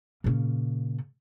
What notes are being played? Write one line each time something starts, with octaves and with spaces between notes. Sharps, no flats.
A#2 C#3